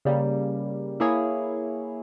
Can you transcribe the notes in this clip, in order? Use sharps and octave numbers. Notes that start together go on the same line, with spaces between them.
C#3 G3 A#3
A#3 E4 G#4 C#5